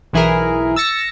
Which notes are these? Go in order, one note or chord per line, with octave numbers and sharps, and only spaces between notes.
B1 E3 E4 G#4 A#4
E6 A6 A#6 C#7